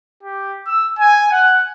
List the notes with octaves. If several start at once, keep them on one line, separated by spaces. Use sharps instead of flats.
G4
E6
G#5
F#5